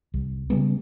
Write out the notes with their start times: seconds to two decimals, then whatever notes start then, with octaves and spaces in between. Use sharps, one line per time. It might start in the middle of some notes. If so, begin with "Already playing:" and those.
0.14 C2
0.50 C#3 G3 G#3 B3